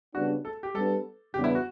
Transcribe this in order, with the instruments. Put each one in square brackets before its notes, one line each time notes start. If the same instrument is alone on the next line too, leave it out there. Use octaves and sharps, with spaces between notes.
[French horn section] C#3 G3 B3 D4 [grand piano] F#4
[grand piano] A4
G4
[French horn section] G3 B3 D4 [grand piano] A4
[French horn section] E2 C#3 G3 B3 D4 [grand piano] G4
[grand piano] E4
F#4